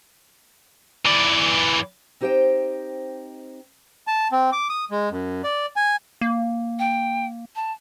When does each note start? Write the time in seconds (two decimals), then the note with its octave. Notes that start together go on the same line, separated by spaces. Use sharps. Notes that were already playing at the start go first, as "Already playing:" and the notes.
1.05 E3 D5
2.21 C4 D#4 G4 C5 D#5 G5
4.07 A5
4.32 C4
4.52 D6
4.70 D#6
4.91 G#3
5.11 F#2
5.44 D5
5.76 G#5
6.21 A#3
6.79 G5
7.56 A5